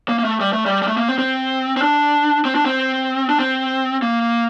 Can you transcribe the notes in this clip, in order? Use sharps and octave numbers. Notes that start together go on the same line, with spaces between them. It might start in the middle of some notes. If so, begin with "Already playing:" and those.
A#3
A#3
A3
G3
A3
G3
G3
A3
A#3
C4
C4
C4
D4
C4
D4
C4
D4
C4
A#3